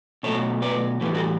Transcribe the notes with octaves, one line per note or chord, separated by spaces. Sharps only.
B2 F#3 A3 A4 C#5
B4 D5
A2 E3 G3 G4 B4
F#4 A4